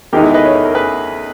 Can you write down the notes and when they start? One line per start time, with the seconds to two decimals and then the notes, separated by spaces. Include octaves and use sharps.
0.13 E2 D#3 G#3 B3 D#4 G4 A#4
0.24 E4 G#4
0.34 B4 D#5
0.45 C#5
0.55 B4
0.65 A#4
0.75 G#4 B4